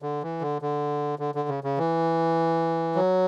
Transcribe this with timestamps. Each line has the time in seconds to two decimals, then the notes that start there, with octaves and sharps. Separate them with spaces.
0.02 D3
0.23 E3
0.41 D3
0.62 D3
1.19 D3
1.35 D3
1.49 C#3
1.64 C#3
1.78 E3
2.95 F#3